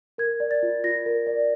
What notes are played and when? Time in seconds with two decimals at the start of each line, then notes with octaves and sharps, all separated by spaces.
0.18 A#4 G#6
0.40 D5
0.51 A6
0.63 F4
0.84 F4 A#6
1.06 A#4
1.27 D5